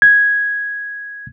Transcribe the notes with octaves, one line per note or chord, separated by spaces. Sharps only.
G#6